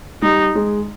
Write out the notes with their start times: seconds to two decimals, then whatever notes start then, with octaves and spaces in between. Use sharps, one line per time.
0.22 G3 D#4
0.55 G#3